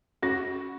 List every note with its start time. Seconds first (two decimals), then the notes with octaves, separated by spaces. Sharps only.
0.22 C#4 F#4